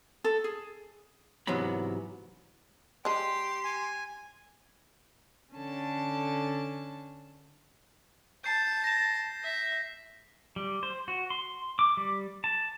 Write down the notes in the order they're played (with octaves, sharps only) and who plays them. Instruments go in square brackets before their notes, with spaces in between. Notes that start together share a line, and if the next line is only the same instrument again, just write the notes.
[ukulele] A4
G#4
[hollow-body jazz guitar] G#2 C3 E3 F#3 B3 B5
[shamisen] G#3 D4 [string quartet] G4 [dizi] C6
[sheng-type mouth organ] G#5
[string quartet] D3 C#4 A4 A5
[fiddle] A5 [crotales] G6 C7
[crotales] A#6 E7
[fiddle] E5
[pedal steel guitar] G3
C5
F#4
C6
D6
G3
A5